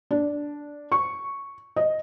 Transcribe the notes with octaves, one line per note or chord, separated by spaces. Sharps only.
D4
C#6
D#5